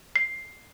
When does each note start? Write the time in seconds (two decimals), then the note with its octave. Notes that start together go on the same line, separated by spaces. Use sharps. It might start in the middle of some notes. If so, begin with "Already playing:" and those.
0.16 C7